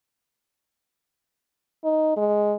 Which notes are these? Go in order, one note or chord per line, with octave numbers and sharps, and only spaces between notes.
D#4
G#3